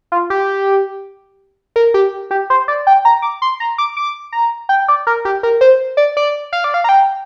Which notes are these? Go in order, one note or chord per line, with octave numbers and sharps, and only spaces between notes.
F4
G4
A#4
G4
G4
C5
D5
G5
A#5
D6
C6
A#5
D6
D6
A#5
G5
D5
A#4
G4
A#4
C5
D5
D5
F5
D5
F5
A#5
G5